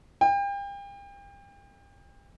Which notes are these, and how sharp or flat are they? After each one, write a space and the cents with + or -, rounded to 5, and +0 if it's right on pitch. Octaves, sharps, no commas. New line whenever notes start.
G5 +35